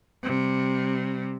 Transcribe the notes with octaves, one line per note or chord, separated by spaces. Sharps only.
C3 G3